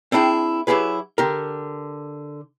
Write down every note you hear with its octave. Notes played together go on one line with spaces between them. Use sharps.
C4 D4 E4 G#4 G5
F#3 E4 G4 G#4 B4
D3 G4 A#4